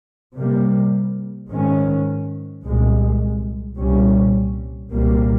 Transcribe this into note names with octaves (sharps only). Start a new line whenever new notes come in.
C3 G3 A#3
G#2 D#3 G#3 C#4
C2 A#2 G#3
C2 A#2 G3 C#4
C2 A#2 G3 A#3